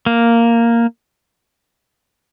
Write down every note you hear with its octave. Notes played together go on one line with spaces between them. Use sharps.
A#3